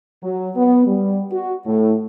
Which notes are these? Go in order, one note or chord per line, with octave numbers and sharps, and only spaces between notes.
F#3
B3
G3
F#4
A2